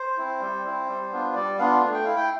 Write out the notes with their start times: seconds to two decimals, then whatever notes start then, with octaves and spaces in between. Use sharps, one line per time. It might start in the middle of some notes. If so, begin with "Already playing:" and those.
Already playing: C5
0.17 C4 E4
0.40 G3
0.64 C4 E4
0.88 G3
1.11 B3 D4 F4
1.35 G3 D5
1.58 B3 D4 F4 F5
1.83 A3
1.94 G5
2.05 E4 F5
2.16 G5